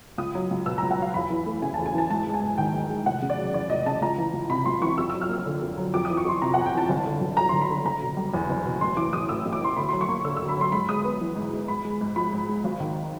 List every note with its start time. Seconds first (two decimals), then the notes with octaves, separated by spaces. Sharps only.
0.18 C#2 D#6
0.35 F#3
0.51 C#2
0.66 B2 E6
0.78 A#5
0.82 C#2
0.91 F#5
0.98 F#3 F5
1.14 E2 B5
1.30 E3
1.46 A3
1.62 C#3 G#5
1.74 A5
1.78 E2
1.86 G#5
1.94 E3 A5
2.10 G#2 A5
2.26 G#3
2.34 G#5
2.41 G#2
2.58 D#3 G5
2.73 G#2
2.90 G#3
3.06 F1 F#5
3.22 C#3
3.30 D5
3.38 F#3
3.54 E2 D5
3.70 F1 D#5
3.86 C#3 A5
4.01 C#2 A#5
4.18 E3
4.33 C#2
4.50 C3 B5
4.66 C#2 C6
4.81 E3 C#6
4.97 F2 E6
5.10 E6
5.14 F#3
5.21 F6
5.29 A#3 E6
5.46 D3
5.61 F2
5.78 F#3
5.94 F2 D6
6.05 D#6
6.10 E3
6.17 C#6
6.25 F2 C6
6.42 C3 A#5
6.54 F#5
6.57 F2 G#5
6.66 G5
6.74 E3 A5
6.89 G1
7.06 D3
7.21 G1
7.37 F#2 A#5
7.49 C6
7.53 G1
7.61 B5
7.69 D3
7.85 F#1 A#5
8.01 B2
8.17 G3
8.34 E2
8.49 F#1
8.65 B2
8.81 A1 C6
8.96 E3 D6
9.13 A1 D#6
9.29 A2 E6
9.45 A1
9.52 D6
9.61 E3 C6
9.77 D2 B5
9.89 C6
9.93 F#3
10.01 C#6
10.08 A#3
10.24 D3 E6
10.37 E6
10.41 D2
10.49 B5
10.57 F#3 C6
10.72 G#2 B5
10.89 G#3 D#6
11.04 B3
11.20 E3
11.36 G#2
11.53 G#3
11.68 G#2 B5
11.84 G#3
12.01 G#2
12.16 F3 B5
12.33 G#2
12.49 G#3
12.64 G#1
12.80 D#3